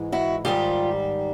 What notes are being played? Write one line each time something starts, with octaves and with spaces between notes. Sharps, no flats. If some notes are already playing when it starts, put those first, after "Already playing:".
Already playing: G#2 E3 G#3
E4 F#4
G#2 D#3 G3 F4 G4